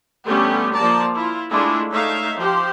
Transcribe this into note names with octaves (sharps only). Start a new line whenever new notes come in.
D3 G3 A3 B3 C#4 G4
F3 A#3 D5 A5 A#5
E4 F4
G#3 A3 D4 E4 F4
A3 D#4 C#5 E5 F5
F3 G4 C5